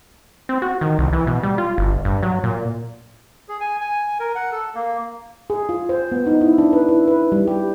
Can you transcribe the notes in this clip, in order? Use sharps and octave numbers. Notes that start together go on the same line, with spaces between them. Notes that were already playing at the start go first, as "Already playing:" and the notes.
C4
F#4
D#3
C2
E3
B2
G3
F4
G1
G2
F#3
A#2
G#4
G#5
G#5
A#4
F#5
A4
A#3
G#4
F4
C5
B3
D#4
E4
D4
B4
E4
B4
G3
G4